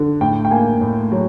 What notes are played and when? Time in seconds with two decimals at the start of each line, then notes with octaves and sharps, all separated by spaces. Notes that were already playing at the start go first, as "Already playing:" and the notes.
Already playing: D3
0.21 A2 G5
0.45 G5
0.51 A#3 G#5
0.81 A2
1.12 F#3